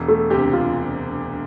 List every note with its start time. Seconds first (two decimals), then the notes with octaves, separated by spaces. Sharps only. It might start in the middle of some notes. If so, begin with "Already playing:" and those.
Already playing: E1
0.08 A3
0.30 D2 C3 G4
0.53 F4